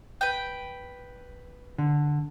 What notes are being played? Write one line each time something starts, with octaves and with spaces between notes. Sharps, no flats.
B4 G5
D3